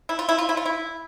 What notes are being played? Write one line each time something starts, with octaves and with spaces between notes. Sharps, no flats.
E4
F4
E4
F4
E4
F4
E4